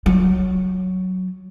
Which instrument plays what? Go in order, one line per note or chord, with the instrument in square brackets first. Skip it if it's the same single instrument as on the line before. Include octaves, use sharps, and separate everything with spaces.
[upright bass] F#3